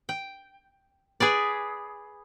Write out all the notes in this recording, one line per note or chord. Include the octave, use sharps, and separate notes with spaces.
G5
G#4 B4 D5